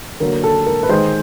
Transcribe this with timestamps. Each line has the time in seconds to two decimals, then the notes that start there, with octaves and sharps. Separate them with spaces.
0.20 D3 F#3 A#3 A#4
0.44 A4
0.66 A#4
0.83 B4
0.89 D#3 G#3 C5